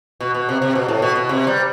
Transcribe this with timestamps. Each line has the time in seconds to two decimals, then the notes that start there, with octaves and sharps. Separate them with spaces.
0.21 B2
0.35 B2
0.49 C3
0.62 C3
0.75 B2
0.88 A2
1.02 B2
1.16 B2
1.29 C3
1.47 G3